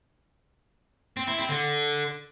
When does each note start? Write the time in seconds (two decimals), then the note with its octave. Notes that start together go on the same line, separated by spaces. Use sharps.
1.17 C4
1.27 E4
1.38 C4
1.49 D3